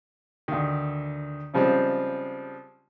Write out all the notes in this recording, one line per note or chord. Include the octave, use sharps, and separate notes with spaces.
D2 D#3
C#3 F3 G3 G#3 C4